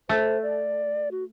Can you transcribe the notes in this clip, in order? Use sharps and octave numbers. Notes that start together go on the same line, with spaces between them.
A3 C5
D5
F#4